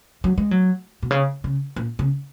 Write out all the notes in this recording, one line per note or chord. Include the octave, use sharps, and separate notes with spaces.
F#3
G#3
F#3
B2
C#3
C#3
A#2
C#3